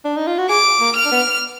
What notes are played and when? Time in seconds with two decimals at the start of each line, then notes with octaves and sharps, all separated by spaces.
0.05 D4
0.17 D#4
0.27 F4
0.38 F#4
0.49 G#4 D6
0.81 A#3
0.96 F6
1.05 D4
1.12 B3